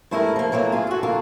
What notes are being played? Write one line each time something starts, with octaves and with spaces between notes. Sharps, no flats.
G2 G#3 A3 E4 G#4 A#4
F3 A#3
E3 F#3 A3 A#3
F4 G#4
F#4 A4
D2 A#3 F4 A4